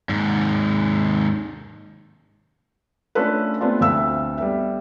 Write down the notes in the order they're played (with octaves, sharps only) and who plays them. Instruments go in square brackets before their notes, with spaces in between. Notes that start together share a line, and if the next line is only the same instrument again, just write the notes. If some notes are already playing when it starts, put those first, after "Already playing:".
[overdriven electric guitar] D#2 G#2
[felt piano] A3 C#4 D4 F4 A4 B4
A3 B3 C4 D4 F4
D2 C4 A4 E5 F5 E6
G3 B3 E5